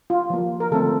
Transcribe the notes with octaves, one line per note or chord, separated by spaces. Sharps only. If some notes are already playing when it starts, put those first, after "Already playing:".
F4
F3 A#3
A#4
D3 F3 A3 C4 A4